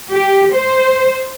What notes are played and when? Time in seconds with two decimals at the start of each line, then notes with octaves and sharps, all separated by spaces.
0.12 G4
0.55 C5